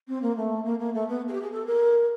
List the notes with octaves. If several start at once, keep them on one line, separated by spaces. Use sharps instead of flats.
C4
A#3
A3
A#3
A#3
A3
B3
G#4
G4
G#4
A4
A#4